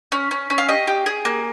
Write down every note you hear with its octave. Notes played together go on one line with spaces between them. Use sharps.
C#4
C#4
C#4
F5
G4 D#5
G4
G#4
A#3